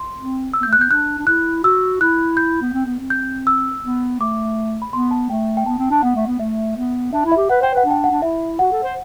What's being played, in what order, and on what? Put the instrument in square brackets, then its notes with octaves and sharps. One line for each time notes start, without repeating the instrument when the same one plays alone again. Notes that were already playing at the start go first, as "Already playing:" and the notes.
Already playing: [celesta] C6
[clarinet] C4
[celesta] E6
[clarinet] B3
[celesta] G6
[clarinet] A3
[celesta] F#6
[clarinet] B3 [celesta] G6
[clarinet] D4 [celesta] F#6
[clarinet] D4
[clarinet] E4 [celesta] F#6
[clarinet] F#4 [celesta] E6
[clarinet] E4 [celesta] F#6
[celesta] G6
[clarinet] B3
C4
B3
C4
[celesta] G6
E6
[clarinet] B3
[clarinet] A3 [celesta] D6
[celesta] B5
[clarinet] B3 [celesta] C6
[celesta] A5
[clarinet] A3 [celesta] G5
[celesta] G5
[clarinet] B3 [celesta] A5
[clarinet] C4
D4
[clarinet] B3 [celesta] F#5
[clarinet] A3
B3
[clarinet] A3 [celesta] E5
[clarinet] B3
[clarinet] D4 [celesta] E5
[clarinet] E4
[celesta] E5
[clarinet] G4
[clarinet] B4 [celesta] F#5
[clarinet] C5 [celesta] G5
[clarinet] B4 [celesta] F#5
[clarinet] D4
[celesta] G5
F#5
[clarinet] D4
[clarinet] E4 [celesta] E5
[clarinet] F#4 [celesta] F#5
[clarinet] A4
C5